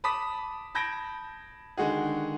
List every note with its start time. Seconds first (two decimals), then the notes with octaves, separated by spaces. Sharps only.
0.04 A5 B5 D6 D#6 B6
0.75 A5 B5 G6 G#6 A#6 D7
1.77 D3 D#3 G#3 F#4 G#4